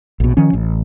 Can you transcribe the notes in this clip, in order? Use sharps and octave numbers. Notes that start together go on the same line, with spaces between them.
A#1 B2
D#3 F3 C#4
A1